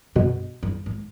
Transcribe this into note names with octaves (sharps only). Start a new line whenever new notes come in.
G2 B2
G2
G#2